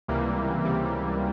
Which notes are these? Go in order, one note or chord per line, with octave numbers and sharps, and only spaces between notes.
C#2 C3 E3 G3 A#3
C#2 C3 E3 G3 A#3